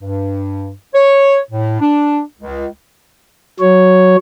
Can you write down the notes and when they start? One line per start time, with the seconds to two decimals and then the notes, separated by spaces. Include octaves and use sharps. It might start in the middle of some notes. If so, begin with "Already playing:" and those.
0.01 G2
0.95 C#5
1.51 A2
1.81 D4
2.40 C#2
3.60 F#3 C#5